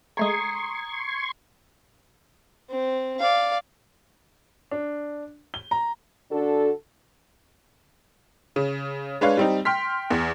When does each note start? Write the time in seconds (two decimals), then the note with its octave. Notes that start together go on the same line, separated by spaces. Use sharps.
0.17 G#3 A3 G#4 A#5 C6 C#6 D#6 G#6
2.70 C4
3.19 D5 F5
4.71 D4
5.54 G7
5.71 A#5
6.31 D3 D4 F#4 A4
8.56 C#3
9.21 G#3 D4 B4 C#5 F5
9.37 G3 C4 D#4
9.65 G5 C6 F6 B6
10.10 E2